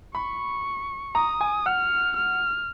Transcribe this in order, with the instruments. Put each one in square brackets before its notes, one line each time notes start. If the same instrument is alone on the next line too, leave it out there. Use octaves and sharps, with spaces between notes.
[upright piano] B5 [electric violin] C#6
[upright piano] A#5 [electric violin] D#6
[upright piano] G#5
[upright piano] F#5 [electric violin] F6
[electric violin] F6